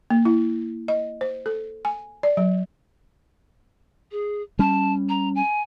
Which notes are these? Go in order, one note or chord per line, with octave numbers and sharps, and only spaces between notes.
A#3
E4
D#5
C5
A4
G#5
D5
F#3
G#4
G3 C#4 A5
A#5
G#5